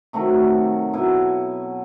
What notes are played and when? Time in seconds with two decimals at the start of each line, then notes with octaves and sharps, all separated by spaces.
0.13 C3 D#3 F#3 A3
0.93 B2 F#3 E4